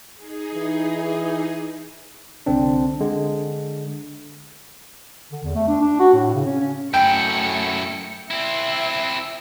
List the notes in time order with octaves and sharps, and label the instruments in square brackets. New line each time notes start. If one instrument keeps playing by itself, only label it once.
[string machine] D#4 G#4
[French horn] E3
[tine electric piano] C2 D3 C4 D4
D3 G#3
[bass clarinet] D3
E2
A3
D4
D4
F#4
A2
C#3
C#4
C#4
[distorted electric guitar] F#2 E4 [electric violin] A3 C#7 [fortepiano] G5
[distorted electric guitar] C4 E4 [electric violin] E5